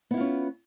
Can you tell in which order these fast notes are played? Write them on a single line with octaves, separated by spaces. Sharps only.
B3 E4 F4 C#4